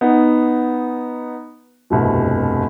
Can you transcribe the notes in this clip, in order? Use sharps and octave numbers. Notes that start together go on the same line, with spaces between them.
B3 D#4
F1 C2 G2 B2